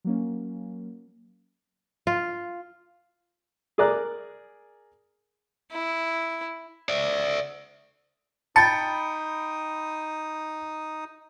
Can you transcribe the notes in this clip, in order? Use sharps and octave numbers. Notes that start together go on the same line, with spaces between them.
F#3 A#3 C#4
F4
G#4 A#4 D5 A#5 F#6
E4
D5 E5
D#4 G5 A5 B5 D#6 C#7